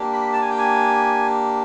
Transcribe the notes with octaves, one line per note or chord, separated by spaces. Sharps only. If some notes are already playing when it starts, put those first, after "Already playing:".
Already playing: A#3 D4 G4
B5
A5
G#5
G5
G#5